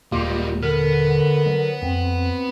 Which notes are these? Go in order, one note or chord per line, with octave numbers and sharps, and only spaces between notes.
D#1 G3 G#3 A#3 F4 G4
D3 B3 A#4
F#3
F2 C4